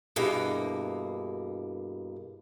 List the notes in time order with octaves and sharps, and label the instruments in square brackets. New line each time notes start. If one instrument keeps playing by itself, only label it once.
[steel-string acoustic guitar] G2 B2 A#3 [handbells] E4 G4 G#4